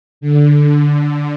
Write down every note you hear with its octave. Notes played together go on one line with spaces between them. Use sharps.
D3